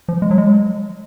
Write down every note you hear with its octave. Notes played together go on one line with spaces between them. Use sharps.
F3
G#3
F#3
G#3